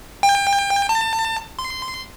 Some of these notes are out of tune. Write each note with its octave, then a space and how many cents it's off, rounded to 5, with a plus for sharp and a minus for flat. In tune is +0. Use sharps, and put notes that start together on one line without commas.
G5 +30
A5 +30
C6 -15